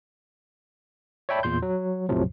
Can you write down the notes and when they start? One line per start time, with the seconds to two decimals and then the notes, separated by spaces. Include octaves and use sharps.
1.29 C#5 D5 E5 G5 A5 B5
1.43 E2 A#2 C6 G6
1.62 F#3
2.09 A#1 F2 A2 C3 F3 F#3